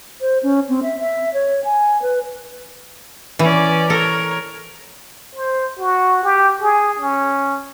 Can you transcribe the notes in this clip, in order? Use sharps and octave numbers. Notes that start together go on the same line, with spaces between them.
C5
C#4
C4
E5
E5
C#5
G#5
B4
E3 C#4 D5
A4 A#4 C#5
C5
F#4
G4
G#4
C#4